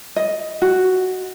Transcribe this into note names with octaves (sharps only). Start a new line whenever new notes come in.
D#5
F#4